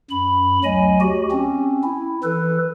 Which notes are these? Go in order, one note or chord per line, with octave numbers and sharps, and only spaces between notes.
F#2 B5
D2 F#3 D#5 G#5
F#4 G4
C4 C#4
E4
E3 A4 B4